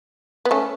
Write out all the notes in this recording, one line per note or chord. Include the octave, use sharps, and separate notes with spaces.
B3
A3 C#4